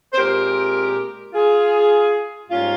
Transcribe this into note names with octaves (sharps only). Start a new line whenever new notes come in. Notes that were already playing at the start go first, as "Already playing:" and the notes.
C5
A#2 G#3 C4 G4 A#4
F4 G#4
G#2 G3 A#3 C#4 F4